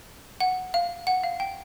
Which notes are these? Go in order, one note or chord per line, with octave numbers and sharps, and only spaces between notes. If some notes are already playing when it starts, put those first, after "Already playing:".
F#5
F5
F#5
F5
G5